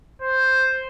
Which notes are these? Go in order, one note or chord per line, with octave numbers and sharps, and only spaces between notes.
C5